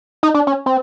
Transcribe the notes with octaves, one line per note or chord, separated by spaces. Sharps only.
D#4
D4
C#4
C4